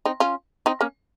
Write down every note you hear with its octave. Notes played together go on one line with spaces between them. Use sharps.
C4 D#4
C#4 F4
C4 D#4
A#3 C#4